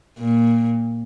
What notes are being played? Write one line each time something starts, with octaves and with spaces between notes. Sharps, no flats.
A#2